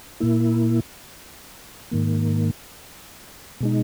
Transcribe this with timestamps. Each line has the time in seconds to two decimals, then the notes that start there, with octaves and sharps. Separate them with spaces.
0.20 A#2 A#3 E4
1.91 G#2 D#3 A#3
3.60 B2 G#3 D#4